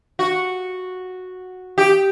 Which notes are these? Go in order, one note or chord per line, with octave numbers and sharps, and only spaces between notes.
F#4
G4